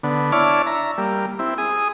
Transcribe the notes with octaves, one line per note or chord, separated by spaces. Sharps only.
D3 B3
D4 E4 C#5 D5 A5 F6
E5 A#5
G3 A#3
C4 E4
G#4 D#6